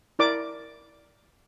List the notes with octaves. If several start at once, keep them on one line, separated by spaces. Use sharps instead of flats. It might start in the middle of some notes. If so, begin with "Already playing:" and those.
E4 A#4 D5 D6